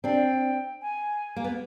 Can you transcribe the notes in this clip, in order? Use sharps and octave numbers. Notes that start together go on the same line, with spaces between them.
C4 D4 G5
G#5
A#3
B3